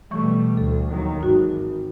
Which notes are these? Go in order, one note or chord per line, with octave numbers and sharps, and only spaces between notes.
B2 E3 G3 A3 C#6
D2 A4
D#2 D#3 F#3
G#1 D#4 F#4